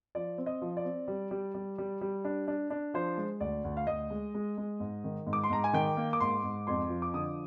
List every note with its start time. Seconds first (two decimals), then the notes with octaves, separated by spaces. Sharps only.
0.15 F3 D5
0.38 C4
0.46 D#5
0.62 F3
0.77 D5
0.85 C4
1.08 G3
1.31 G3
1.54 G3
1.78 G3
2.01 G3
2.25 D4
2.48 D4
2.70 D4
2.94 F3 C5
3.18 G#3
3.40 D2 D5
3.64 D2
3.77 F5
3.87 D2 D#5
4.10 G#3
4.34 G#3
4.58 G#3
4.80 G#2
5.04 D#3
5.27 G#2
5.33 D6
5.44 C6
5.50 G#2 A#5
5.64 G#5
5.73 D#3 G5
5.97 A#3
6.13 D6
6.20 G#2 C6
6.44 G#2
6.67 F2 C6
6.90 F3
7.02 D6
7.14 D3 D#6